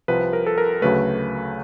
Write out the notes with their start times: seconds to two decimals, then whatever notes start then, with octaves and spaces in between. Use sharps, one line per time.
0.08 C2 C3 F3 B4
0.33 A#4
0.46 A4
0.58 A#4
0.82 D2 C#3 F#3 A3 B4